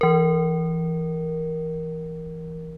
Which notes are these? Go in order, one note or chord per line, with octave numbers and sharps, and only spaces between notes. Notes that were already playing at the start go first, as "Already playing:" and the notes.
E3 A#4